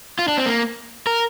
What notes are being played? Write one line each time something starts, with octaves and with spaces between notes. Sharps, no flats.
F4
D4
C4
A#3
A#4